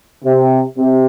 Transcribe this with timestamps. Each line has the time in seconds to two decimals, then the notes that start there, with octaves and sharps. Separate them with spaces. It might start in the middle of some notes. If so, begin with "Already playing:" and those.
0.24 C3
0.77 C3